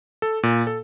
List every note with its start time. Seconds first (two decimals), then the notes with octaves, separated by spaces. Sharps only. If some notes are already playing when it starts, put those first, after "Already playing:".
0.22 A4
0.43 A#2
0.67 A4